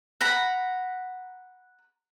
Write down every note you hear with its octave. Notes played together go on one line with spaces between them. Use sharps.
F#5 A#5 B5